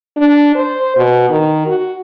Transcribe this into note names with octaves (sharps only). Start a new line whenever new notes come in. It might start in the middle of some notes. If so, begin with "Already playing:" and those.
D4
C5
B2
D#3
F#4